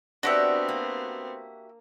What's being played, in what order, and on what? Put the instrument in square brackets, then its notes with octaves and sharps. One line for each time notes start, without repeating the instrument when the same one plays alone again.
[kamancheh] B3 C4 [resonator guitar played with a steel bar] D4 [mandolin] F#4 G4 E5
[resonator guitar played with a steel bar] A#3